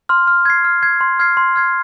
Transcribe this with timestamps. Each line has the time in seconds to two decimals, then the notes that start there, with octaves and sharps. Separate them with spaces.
0.09 C6 F6
0.27 F6
0.45 G#6 C7
0.65 F6
0.83 G#6 C7
1.01 C6
1.19 F6 G#6 C7
1.37 C6
1.56 F6 G#6 C7